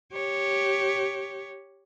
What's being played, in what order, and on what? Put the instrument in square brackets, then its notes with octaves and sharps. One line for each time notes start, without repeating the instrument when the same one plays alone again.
[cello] G4 C#5